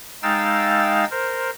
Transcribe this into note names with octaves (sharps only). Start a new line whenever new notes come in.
G#3 D#4 F5 G5 E6 A6
A#4 C5